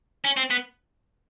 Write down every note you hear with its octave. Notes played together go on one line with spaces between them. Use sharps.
C#4
C4
B3